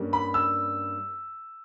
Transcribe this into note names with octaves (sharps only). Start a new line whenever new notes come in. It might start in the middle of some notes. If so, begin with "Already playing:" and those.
Already playing: G2 G3 A#3 C#4
B5
E6